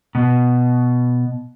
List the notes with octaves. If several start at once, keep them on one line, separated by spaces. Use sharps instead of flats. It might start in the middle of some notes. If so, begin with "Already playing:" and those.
B2